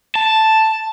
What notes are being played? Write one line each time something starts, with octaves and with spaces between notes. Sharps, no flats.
A5